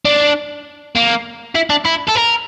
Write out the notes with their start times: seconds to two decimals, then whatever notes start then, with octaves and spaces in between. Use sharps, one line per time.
0.05 D4
0.95 A#3
1.55 E4
1.70 D4
1.85 E4
2.08 A4
2.15 A#4